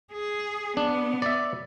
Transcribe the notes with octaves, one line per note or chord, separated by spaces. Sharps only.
G#4
B3 D4
D5 E5